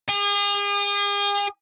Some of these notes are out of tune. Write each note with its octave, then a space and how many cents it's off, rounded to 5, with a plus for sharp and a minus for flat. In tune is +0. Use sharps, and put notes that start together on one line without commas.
G#4 -40